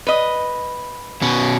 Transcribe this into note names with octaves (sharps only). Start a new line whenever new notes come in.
B4 D#5
B2 C#4